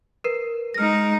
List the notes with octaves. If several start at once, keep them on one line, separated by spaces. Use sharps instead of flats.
A#4 B4 C7
G#3 D#4 F6 A#6